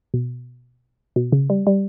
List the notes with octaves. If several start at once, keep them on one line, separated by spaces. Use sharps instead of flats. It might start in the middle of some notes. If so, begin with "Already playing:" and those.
B2
B2
C#3
G3
G3